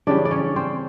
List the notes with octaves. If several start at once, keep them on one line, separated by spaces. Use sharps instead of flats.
C#3 E3 G3 D4 D5
D5
C#4 C#5
C4 C5